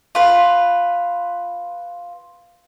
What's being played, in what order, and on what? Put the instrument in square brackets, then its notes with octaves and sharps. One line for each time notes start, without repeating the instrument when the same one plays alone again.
[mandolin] F4 B4